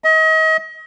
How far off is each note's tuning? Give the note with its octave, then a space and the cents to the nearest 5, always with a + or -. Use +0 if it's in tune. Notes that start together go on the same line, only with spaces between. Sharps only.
D#5 +35